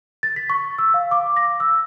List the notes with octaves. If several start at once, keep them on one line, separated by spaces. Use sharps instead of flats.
A6
B6
C#6
E6
F5
D6
A#6
E6